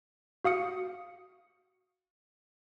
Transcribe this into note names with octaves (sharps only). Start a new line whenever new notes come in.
F#4 F5 D#6 C#7